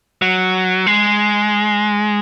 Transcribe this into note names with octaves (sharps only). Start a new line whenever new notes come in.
F#3
G#3